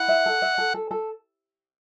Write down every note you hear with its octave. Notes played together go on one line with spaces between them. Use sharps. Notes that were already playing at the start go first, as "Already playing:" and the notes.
Already playing: E4 F#5
E5
A4
E5
A4
A4
A4